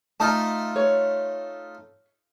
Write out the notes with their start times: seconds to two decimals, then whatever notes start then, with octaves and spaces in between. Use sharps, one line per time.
0.20 A3 D#4 F4 A5
0.76 C#5